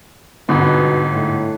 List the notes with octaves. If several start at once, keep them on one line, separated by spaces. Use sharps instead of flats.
G1 G#2 B2 B3
A2